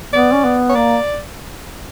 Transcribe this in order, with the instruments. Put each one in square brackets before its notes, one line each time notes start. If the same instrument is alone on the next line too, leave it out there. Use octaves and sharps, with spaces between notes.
[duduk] B3 [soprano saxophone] D5
[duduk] C#4
B3
[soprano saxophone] C#5
[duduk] A#3 [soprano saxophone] D5